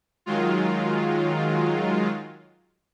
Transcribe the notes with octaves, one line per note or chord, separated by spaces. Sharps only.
D#3 F#3 G#3 F4